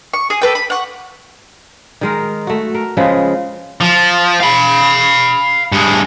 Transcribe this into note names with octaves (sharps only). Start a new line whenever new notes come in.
C#6
G#4
A4 B4 G5
B5
F#5 C#6
D#3 G#3 A#4
A3 F#4
A#4
C#3 F3 G#3 B4
F3
F5 B5
G2 G#3